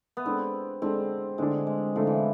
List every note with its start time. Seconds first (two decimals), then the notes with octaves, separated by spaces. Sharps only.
0.17 B3
0.25 G#3 C4 D4 A4
0.82 G#3 C4 D4 A4
1.38 D3 G#3 A3 D4
1.67 G#3
1.96 D3 F3 A3 D4
2.07 E3